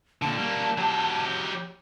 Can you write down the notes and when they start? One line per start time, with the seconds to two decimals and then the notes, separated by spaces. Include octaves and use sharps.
0.22 A#2 D3 A5
0.38 G3 A#3
0.78 F#3 G4